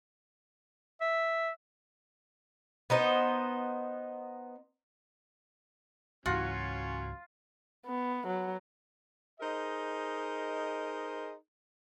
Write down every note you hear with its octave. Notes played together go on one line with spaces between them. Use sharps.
E5
B3 D#4 C5
C#2 G#2 E3 F#3 C#4 F4 F#4
B3
F#3
D#4 G#4 A#4 C5 D#5